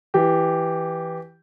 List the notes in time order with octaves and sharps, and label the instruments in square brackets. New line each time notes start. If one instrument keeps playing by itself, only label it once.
[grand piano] E3 G4